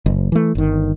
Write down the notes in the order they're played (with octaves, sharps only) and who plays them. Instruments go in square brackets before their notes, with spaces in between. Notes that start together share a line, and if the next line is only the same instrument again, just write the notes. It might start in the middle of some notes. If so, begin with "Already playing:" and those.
[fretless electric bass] F#1
E3 A3
G1 D#3